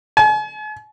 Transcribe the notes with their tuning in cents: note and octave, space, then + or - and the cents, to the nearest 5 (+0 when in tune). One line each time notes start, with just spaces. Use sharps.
G#5 +45